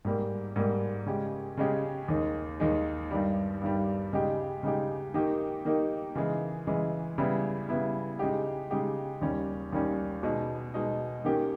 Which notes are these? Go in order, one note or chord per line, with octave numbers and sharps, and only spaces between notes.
G#2 G3 A#3
G#2 G3 A#3
C#3 G#3 C#4 G4
C#3 G#3 C#4 G4
D#2 D#3 G#3
D#2 D#3 G#3
G2 D#3 G3
G2 D#3 G3
C#3 G#3 D#4 G4
C#3 G#3 D#4 G4
D#3 A#3 D#4 G4
D#3 A#3 D#4 G4
C#3 E3 G#3
C#3 E3 G#3
C#3 G3 B3 E4
C#3 G3 B3 E4
C#3 G#3 D#4 G4
C#3 G#3 D#4 G4
D#2 D#3 G3 C#4
D#2 D#3 G3 C#4
B2 G#3 D#4
B2 G#3 D#4
D#3 A#3 C#4 G4